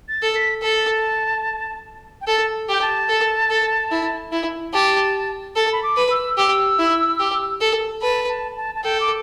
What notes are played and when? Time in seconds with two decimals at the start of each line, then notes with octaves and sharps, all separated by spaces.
0.09 A6
0.22 A4
0.35 B6
0.62 A4 A5
2.21 G5
2.27 A4 A5
2.68 G4 G5
2.82 A5
3.09 A4
3.50 A4
3.91 E4
4.32 E4
4.73 G4 A5
5.55 A4 A5
5.72 B5
5.83 D6
5.97 B4
6.11 E6
6.37 G4 E6
6.78 E4
7.20 G4
7.61 A4
8.01 B4 A5
8.29 A5
8.57 A5
8.75 A5
8.84 A4 G5
9.00 D6